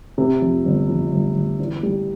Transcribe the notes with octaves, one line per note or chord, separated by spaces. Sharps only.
C3
F2
G1
F2
G1
G1
E2
G3